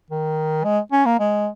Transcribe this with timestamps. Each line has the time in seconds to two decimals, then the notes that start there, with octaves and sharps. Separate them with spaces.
0.11 D#3
0.65 G#3
0.92 C#4
1.06 A#3
1.19 G#3